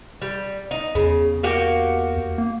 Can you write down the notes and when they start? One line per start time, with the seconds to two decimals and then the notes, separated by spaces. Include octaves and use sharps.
0.22 G3
0.71 D#4
0.95 E2 C#3
1.43 A#3 F#4 G4
2.38 A#3